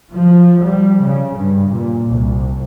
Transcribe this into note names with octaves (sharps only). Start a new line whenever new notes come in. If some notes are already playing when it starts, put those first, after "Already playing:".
F3
G3
C#3
G2
A#2
C2